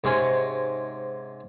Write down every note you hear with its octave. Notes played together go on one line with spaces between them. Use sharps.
G#2 C3 C#4 G#5